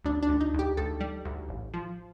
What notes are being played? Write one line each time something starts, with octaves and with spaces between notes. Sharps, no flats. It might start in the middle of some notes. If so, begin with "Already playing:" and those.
D2 D4
D4
D2
D#4
D2
G4
D2 A4
G3
D2
A1
F3